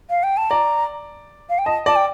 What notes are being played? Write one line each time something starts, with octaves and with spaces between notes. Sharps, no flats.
F5
G5
A5
D5 A#5
F5
G5
D#5 A5
D5 A5
G5